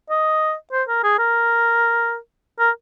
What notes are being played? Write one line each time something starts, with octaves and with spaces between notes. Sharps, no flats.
D#5
C5
A#4
G#4
A#4
A#4